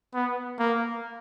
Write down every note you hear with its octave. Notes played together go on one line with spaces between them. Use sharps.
B3
A#3